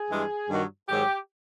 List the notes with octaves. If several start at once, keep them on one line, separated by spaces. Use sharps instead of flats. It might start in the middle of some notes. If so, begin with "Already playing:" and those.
Already playing: G#4
G2 E3 G#3
G2 D#3 F#3
G#2 D#3 F#3 G4